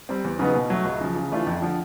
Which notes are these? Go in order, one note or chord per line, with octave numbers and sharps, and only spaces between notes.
G3 C4
E2
C#3 F#3 B3 D#4
B2
F#3 A3
C#2
C#3 F3
C#3
E3 A3 D4 F4
F2
D3 F3